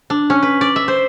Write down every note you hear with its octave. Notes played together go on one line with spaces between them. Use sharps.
D4
C#4
B4
D5
E5
C5